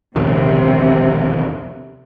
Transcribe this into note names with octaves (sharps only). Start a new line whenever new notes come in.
E1 A#1 D#2 C3